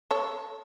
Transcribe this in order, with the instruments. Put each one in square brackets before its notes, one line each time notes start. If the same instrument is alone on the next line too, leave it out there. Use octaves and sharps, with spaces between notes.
[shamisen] A4 C#5